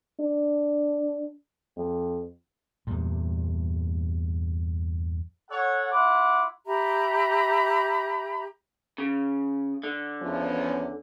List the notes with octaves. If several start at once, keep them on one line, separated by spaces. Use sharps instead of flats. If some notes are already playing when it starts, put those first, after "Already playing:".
D4
F2
E2 G2 A#2
A4 C#5 F#5
E4 F4 F#5 D6
G4 E5 A#5 B5
C#3
D3
E2 F3 C#4